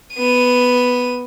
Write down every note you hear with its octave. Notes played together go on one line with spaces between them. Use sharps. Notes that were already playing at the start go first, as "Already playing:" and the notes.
B3 D#7